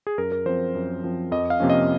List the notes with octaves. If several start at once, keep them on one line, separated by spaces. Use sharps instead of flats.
G#4
F#2 A#4
A#4
F3 C4 C5
F#2
F3 C4
F2 D#5
F5
C3 F3 A#3 C#4
D#5